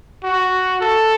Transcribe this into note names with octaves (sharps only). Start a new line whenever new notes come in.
F#4
A4